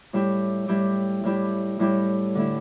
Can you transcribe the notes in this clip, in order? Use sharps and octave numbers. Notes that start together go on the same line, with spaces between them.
A2 G3 E4 G4
A2 G3 E4 G4
A2 G3 E4 G4
A2 G3 E4 G4
D3 A3 E4